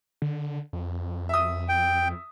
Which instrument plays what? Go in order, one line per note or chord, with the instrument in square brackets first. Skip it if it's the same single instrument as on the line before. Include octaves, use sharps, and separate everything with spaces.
[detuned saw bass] D3
F2
[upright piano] E5 D#6
[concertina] G5